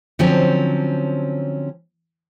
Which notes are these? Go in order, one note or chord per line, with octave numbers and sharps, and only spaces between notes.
D3 F3 F#3 C4 C#4